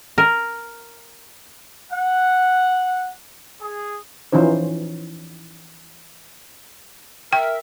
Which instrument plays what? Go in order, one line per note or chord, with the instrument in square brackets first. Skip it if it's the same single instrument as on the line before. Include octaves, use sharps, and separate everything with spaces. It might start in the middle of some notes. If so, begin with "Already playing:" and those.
[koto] A#4
[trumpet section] F#5
G#4
[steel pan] E3 F3 C#4 D#4 C5
[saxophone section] A#4 E5 [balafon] G5